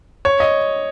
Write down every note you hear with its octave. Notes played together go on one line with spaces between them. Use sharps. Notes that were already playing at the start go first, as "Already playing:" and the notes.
C#5
D#5